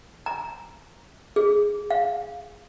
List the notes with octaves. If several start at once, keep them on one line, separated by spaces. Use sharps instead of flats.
A#5
G#4
F5